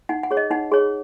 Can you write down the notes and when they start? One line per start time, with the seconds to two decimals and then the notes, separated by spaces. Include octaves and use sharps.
0.09 D#4 F#5
0.23 F#5
0.31 G#4 C#5
0.37 D#5
0.51 D#4 F#5
0.72 G#4 C#5